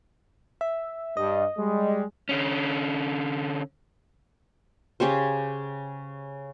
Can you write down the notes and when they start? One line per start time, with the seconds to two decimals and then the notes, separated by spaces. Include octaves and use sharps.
0.61 E5
1.17 G2 D#5
1.57 G3 G#3
2.29 D3 C#4
5.00 C#3 C#4 G4 C5